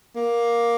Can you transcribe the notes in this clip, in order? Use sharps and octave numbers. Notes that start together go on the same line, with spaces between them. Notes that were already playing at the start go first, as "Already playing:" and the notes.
A#3